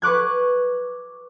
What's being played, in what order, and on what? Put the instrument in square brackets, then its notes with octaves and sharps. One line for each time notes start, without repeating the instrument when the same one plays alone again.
[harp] B4 C#6 D6 F#6 G#6